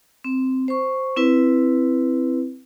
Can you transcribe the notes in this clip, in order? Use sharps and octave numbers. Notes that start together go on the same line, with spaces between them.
C4
C5 C#6
C4 E4 B4